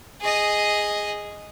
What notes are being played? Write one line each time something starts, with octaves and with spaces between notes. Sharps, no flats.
G#4 D#5